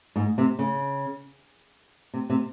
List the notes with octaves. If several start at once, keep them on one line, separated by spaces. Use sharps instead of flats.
G#2
C3
C#3
C3
C3